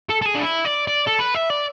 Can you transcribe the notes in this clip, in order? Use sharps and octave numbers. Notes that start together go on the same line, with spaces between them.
A4
A4
G#4
D4
E4
D5
D5
A4
B4
E5
D5